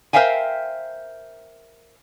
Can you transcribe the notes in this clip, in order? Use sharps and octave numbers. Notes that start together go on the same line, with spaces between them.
A#4 C5 E5 F5 G5 G#5